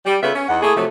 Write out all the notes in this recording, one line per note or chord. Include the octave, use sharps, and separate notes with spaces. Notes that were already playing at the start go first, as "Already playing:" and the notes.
G3
C#3 B3 F4 A4 B4 E5
C#4
E2 D#4 F#5
A3 A#3 E4 G#4
C3 F3 F#3 A3